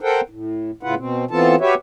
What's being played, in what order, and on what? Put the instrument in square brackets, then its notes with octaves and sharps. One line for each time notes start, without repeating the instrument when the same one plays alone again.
[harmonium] A4 A#4 C5 F#5 G5
A2
A2 C#3 E4 F4 B4 F#5
B2 C4
E3 B3 C4 F4 A4 A5
F#4 G4 B4 C#5 E5